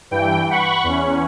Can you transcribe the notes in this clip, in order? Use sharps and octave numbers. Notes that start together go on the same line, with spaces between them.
G2 E3 G5
F#5 B5 C#6
E2 C#4